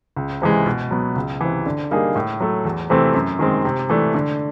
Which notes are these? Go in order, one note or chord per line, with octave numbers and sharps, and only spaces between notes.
C#2
C3 E3 G#3
B2
F#3 B3
C#2
C3 E3
D3
G3 A#3 D#4 G#4
A2
F#3 A3
E2
C3 E3 A3 C4
F#2
D#3 G#3 C4
C3
E3 A3 D4
D3